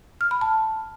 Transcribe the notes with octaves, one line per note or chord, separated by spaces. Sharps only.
F6
B5
A5